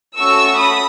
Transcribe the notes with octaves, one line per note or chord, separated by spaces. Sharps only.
A3 C#4 F#4 A4 C#6 E6
B5 D#6